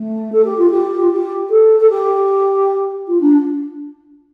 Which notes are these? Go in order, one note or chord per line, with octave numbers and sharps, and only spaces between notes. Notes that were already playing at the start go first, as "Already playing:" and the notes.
Already playing: A3
A4
G4
F4
G4
F4
G4
A4
A4
G4
F4
D4